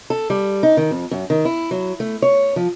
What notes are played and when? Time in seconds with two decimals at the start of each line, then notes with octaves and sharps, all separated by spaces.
0.10 A4
0.30 G3
0.63 D#4
0.77 D#3
0.91 F2
1.11 F#2
1.30 D#3
1.45 E4
1.71 F#3
2.00 A3
2.22 C#5
2.56 F3